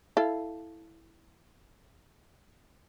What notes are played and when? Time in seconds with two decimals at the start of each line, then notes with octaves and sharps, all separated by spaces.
0.17 E4 A4 F5